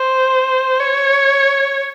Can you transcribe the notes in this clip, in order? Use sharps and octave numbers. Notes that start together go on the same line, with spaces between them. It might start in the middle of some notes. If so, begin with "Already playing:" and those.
Already playing: C5
C#5